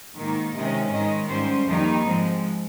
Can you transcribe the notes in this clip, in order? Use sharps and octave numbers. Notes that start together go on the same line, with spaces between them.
G#2 D#3 A#3 D#4
C3 D#3 G#3 C#4 D#5
G#2 D#3 G#3 D#5
G#2 G3 C#4 C5
F2 D#3 G3 A#3 D#4
G#2 F3 G#3 C4